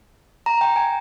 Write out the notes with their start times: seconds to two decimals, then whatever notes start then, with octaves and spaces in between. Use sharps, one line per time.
0.46 A#5
0.61 G5
0.76 G#5